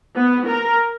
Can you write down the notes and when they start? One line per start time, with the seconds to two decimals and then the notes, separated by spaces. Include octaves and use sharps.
0.16 B3
0.48 A#4